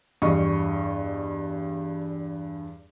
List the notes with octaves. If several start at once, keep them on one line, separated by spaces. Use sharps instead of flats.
E2 G2 D#5 C#6